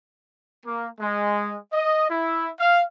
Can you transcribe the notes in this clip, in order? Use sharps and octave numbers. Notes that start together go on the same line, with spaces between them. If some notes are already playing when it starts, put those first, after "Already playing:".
A#3
G#3
D#5
E4
F5